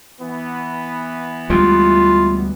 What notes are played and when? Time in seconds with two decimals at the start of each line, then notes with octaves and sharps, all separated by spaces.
0.20 E3 B3
1.50 D2 G3 G#3 F4